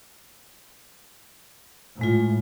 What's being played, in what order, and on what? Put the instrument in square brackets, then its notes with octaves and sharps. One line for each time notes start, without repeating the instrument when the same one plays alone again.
[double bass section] A2 [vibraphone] G#3 F4